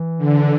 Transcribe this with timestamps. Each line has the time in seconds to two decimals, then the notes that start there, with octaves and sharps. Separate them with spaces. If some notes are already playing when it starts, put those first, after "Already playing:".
Already playing: E3
0.18 D3